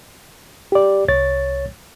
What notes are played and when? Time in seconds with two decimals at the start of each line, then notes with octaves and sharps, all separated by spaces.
0.72 G4 D5
1.08 C2 C#5 A6